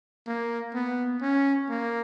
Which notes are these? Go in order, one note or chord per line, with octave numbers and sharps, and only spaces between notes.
A#3
B3
C#4
A#3